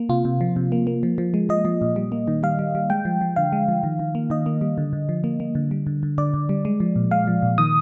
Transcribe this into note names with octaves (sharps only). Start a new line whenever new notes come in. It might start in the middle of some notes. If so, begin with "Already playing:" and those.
Already playing: A#3
C3 F4
C3
F3
C3
A#3
A#3
F3
F3
G#3
F3 D#5
F3
A#2
G3
A#3
D#3
G3 F5
G3
G3
G#3 G5
F3
F3
D3 F5
G#3
F3
D#3
D#3
A#3
D#3 D#5
A#3
G3
D3
D3
F3
A#3
A#3
D3
G3
D3
D3
D3 D5
D3
G3
G#3
F3
A#2
G#3 F5
F3
A#2
D#3 D#6